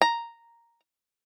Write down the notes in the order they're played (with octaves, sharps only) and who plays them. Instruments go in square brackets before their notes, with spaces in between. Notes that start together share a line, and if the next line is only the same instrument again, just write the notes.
[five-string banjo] A#5